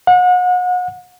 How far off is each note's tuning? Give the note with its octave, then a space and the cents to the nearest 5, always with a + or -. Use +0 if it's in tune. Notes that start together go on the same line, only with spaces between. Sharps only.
F#5 -35